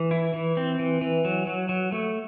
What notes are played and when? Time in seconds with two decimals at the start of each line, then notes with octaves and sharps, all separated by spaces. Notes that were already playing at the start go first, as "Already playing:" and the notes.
Already playing: E3
0.11 E4
0.34 E3
0.57 C4
0.79 E3
1.01 E3
1.25 F#3
1.47 F#3
1.69 F#3
1.92 A3